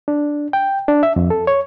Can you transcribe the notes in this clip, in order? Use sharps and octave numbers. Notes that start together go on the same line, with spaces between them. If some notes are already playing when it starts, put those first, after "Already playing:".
D4
G5
D4
E5
F2
A4
C#5